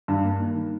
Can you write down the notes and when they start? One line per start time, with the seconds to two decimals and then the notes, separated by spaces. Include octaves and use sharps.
0.08 G2
0.24 A#3
0.40 D#3
0.56 G3